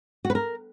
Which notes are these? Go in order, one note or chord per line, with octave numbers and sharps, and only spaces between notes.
F#4
B4
A#4